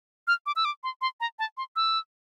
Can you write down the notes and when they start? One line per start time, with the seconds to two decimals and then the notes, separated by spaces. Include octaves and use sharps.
0.28 F6
0.46 D6
0.56 E6
0.65 D6
0.83 C6
1.01 C6
1.20 A#5
1.39 A5
1.57 C6
1.76 E6